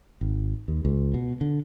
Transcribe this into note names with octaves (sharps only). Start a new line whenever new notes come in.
G#1
D#2
C#2
B2
D3